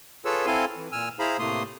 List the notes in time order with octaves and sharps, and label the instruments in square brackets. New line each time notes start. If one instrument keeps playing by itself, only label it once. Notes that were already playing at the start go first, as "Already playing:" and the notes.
[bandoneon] F4 G#4 A4 B4 C#5 E6
C4 E4 A4 F5 G#5 C6
E3
A#2 G#5 E6 F6
E4 G#4 C5 F5 A#5 B5
A2 C3 A3 A#3 C6 D#6